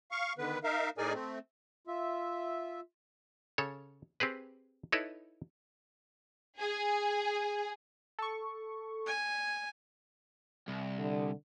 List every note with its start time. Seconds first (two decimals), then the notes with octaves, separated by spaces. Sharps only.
0.11 F5 C#6
0.38 D3 D#3 B3 B4
0.64 D#4 A#4 E5 F5
0.98 A2 D#4 G#4 A#4 D5 G#5
1.13 A3 C4
1.87 F4 E5
3.58 C#3 A4 C#5
4.20 C4 G4 G#4 B4
4.92 D#4 E4 A4 B4 C#5
6.58 G#4
8.19 A4 C#6
9.07 G#5
10.68 C2
10.99 D3